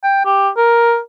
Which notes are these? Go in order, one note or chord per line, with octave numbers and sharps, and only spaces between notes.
G5
G4
A#4